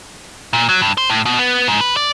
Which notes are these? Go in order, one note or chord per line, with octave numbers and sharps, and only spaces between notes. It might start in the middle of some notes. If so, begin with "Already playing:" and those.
A#2
F#3
G2
C5
A2
B2
B3
G#2
B4
D5